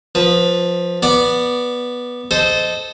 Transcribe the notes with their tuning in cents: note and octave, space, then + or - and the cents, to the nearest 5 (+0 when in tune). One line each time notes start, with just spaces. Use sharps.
F3 +15 B4 +0
B3 -10 D5 +0
A4 -10 C5 -10 D#5 -5